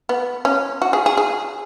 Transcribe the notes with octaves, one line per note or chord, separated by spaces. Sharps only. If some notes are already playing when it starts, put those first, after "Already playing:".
B3
C#4
F#4
G#4
G#4
G#4